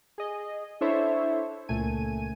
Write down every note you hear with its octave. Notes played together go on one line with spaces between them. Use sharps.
G#4 D#5
D4 E4 A4 C5 C#5 E5
C#2 A#2 A3 G#5 D#7